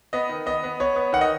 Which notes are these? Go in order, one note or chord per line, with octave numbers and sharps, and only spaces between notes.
B3 D#5
D#3
B3 D#5
B3
B3 C#5
B3
D#3 F#5
D#5